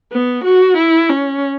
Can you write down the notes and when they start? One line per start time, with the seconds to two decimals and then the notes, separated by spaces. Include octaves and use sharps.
0.12 B3
0.44 F#4
0.77 E4
1.09 C#4